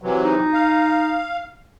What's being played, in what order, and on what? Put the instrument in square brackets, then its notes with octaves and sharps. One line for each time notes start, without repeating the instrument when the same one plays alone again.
[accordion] C3 E3 F#3
[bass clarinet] D#4
[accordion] F5